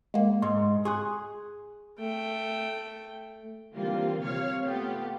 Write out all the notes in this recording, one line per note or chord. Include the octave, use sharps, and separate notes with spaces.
G#3 A#3
G#2 C6
G#4 C6 C#6 F#6
A3 G5
D3 E3 G3 A#3 C4 F4
C3 C#5 F5 F6
A3 B3 F4 G4